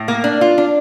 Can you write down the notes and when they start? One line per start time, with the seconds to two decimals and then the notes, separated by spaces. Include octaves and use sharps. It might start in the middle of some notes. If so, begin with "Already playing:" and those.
Already playing: A2
0.08 A#3
0.24 D4
0.41 F4
0.58 D4